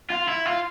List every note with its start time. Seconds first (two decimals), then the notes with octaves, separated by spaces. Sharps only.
0.10 F4
0.28 E4
0.45 F4